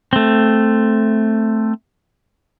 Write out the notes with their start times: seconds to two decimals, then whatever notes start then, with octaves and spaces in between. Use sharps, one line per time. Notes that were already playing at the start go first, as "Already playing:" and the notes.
0.13 A3 C4